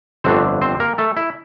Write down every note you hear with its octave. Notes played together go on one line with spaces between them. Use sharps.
G1 F2 D3 A3 C4 D4 C5
C4 C5
A#3 A#4
A3 A4
E4